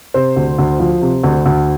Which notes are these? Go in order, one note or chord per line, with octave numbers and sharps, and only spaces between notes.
C3 C5
D2
D2
F3
C3
D2
D2